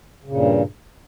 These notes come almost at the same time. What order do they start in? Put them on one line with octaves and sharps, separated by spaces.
C#3 A#2 G2